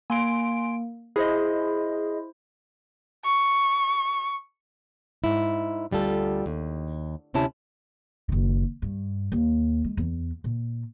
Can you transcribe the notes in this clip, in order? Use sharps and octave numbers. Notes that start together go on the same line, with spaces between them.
A#3 G#5 C6 D7
E4 G#4 C5 D#5
C#6
G#2 E4
D2 G3 F4 A4
D#2
D2 C3 C#4 E4 A5
F#1 D#3
G2
D#2
G#3
E2
A#2